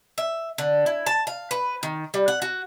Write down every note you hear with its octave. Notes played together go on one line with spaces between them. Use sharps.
E5
D3
E4
A5
F5
B4
D#3
G3
F#5
F#4